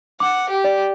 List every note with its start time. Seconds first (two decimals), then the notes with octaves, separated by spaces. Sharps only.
0.20 F#5 D6
0.49 G4
0.64 D5